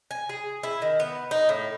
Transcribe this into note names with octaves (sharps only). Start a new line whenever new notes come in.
G#5
G#4
E4
D#3
B3
D#4
A2